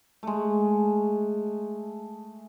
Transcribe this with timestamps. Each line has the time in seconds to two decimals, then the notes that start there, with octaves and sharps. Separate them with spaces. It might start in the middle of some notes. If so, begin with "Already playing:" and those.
0.23 G#3 A3